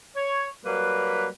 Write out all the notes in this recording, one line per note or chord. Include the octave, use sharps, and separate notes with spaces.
C#5
F#3 G3 A#3 B4